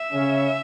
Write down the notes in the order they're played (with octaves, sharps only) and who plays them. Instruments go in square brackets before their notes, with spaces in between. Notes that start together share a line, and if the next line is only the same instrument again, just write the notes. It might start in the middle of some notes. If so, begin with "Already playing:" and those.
Already playing: [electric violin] E5
[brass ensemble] C#3 C#4